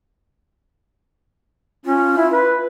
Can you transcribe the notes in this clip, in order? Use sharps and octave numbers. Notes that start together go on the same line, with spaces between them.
C#4 F4
E4
B4